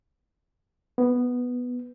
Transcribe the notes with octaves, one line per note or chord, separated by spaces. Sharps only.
B3